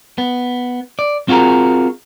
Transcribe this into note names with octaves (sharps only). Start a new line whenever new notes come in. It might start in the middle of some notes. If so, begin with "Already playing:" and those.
B3
D5
C4 F4 F#4 G#4 A#4